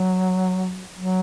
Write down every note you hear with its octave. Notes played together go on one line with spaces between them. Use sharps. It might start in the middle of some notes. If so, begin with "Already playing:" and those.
Already playing: F#3
F#3